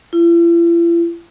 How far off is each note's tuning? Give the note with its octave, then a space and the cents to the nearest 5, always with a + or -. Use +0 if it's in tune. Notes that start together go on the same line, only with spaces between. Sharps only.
E4 +45